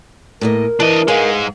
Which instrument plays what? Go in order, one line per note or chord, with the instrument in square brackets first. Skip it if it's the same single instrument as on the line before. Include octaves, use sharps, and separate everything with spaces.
[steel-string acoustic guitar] A2 A#3 D#5 [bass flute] A#4
[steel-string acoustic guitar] E3 [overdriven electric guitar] D4 D#5
[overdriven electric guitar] G#2 G#3 [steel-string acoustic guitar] G#4 F5